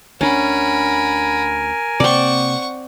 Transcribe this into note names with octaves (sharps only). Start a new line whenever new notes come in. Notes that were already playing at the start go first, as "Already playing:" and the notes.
D2 C#4 D4 A#4 F#5 G#5 B5
C3 A#3 C4 D5 F#5 C#6